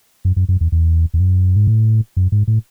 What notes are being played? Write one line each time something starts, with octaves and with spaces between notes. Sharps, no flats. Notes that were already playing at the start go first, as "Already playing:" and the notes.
F#2
F#2
F#2
E2
E2
E2
F#2
G#2
A2
F#2
G#2
A2